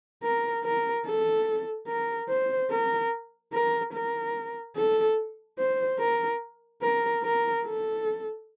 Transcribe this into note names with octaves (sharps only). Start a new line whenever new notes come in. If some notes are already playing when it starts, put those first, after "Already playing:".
A#4
A#4
A4
A#4
C5
A#4
A#4
A#4
A4
C5
A#4
A#4
A#4
A4